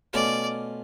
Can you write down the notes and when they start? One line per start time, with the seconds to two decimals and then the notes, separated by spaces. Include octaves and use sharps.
0.13 B2 A3 C#4 F4 D5